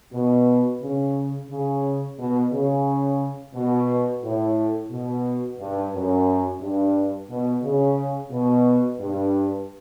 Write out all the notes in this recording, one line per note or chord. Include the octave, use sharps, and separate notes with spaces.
B2
C#3
C#3
B2
C#3
B2
A2
B2
G2
F#2
G2
B2
C#3
B2
G2